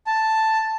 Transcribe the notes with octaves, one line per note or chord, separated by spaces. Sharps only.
A5